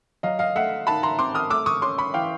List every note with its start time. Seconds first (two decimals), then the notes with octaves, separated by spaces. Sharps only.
0.23 F#3 D#5 F5
0.39 D#5 F5
0.55 A3 E5 F#5
0.87 D#3 A5 B5
1.03 A#5 C6
1.19 C4 C6 D6
1.35 D#6 F6
1.50 A3 D6 E6
1.66 C#6 D#6
1.82 C#4 C6 D6
1.98 B5 C#6
2.14 E3 F5 G5